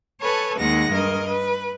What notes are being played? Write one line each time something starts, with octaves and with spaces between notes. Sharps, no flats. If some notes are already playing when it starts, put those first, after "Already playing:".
A4 B4 C#5 G#5 A5
D#2 G#3 D#4 F#5 A#6
G2 A#4 D#5
B4